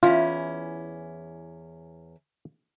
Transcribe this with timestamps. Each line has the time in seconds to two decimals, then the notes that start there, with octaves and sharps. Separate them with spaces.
0.03 E2 C#4 E4 F4